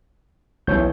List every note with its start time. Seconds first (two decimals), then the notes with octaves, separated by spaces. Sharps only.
0.67 B1 E3 C#5 G6